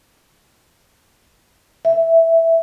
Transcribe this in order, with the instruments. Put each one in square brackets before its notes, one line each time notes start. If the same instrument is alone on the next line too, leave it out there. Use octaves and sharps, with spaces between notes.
[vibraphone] E5